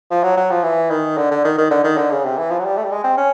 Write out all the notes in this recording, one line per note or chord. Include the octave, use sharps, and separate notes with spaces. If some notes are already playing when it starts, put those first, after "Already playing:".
F3
F#3
F#3
F3
E3
D#3
D3
D3
D#3
D#3
D3
D#3
D3
C#3
C3
E3
F3
F#3
G3
A3
G3
G#3
C4
C#4